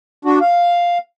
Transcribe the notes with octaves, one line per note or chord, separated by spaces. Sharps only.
D4 F#4
F5